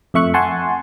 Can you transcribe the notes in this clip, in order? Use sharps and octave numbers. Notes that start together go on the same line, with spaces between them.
F2 A3 E5 C#6 F#6
F#5 G#5 A5 C6 C#6